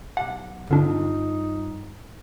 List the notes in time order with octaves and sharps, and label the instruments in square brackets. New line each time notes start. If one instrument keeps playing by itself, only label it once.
[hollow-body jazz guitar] B1 G4 A5 [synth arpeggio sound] F#5
[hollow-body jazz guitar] G2 C4 F4 [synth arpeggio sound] D3 D4 [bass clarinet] D#4